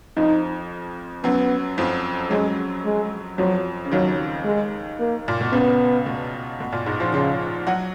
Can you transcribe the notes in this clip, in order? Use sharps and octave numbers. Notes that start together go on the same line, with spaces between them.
F2 F3 D#4
F#2 F#3 B3
F2 F3
F#2 F#3 G#3
G#3
F2 F3 F#3
C#3
D#2 D#3 F#3
G#3
A#3
A#2
B2
C#2 C#3 B3
B2
B2
A#2
G#2 G#3
F3 F4
C#3 F3 F4
F#3 F#4